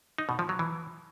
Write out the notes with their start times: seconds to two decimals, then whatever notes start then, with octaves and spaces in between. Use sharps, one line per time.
0.18 D#4
0.29 B2
0.39 F3
0.49 F#3
0.59 E3